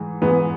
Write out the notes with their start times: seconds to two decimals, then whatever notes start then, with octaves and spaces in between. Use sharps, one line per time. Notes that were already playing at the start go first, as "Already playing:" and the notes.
Already playing: G#2 E3 G#3
0.21 G#2 E3 G#3 B3